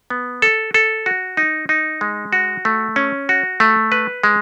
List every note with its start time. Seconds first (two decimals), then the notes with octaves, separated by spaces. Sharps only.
0.10 B3
0.42 A4
0.74 A4
1.06 F#4
1.37 D#4
1.69 D#4
2.01 G#3
2.33 F#4
2.65 A3
2.96 C#4
3.29 F#4
3.60 A3
3.92 B4
4.23 G#3